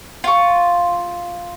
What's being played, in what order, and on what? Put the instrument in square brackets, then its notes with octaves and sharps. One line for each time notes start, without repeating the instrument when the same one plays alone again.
[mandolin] F4 C#6